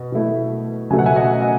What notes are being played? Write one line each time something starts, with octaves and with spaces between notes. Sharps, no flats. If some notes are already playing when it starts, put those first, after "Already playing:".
Already playing: B2
B2 A3 E4
C#2 B2 F#3 A3 G#5
F#5
E5 G#5
D#5 F#5
D#5 F#5